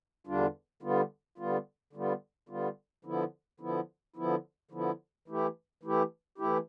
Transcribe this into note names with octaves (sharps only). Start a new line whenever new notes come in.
E2 D3 G3 D4 F4
D3 G3 B3 F4
D3 G3 B3 F4
D3 G3 B3 F4
D3 G3 B3 F4
D3 F3 B3 E4
D3 F3 B3 E4
D3 F3 B3 E4
D3 F3 B3 E4
E3 A3 E4 G4
E3 A3 E4 G4
E3 A3 E4 G4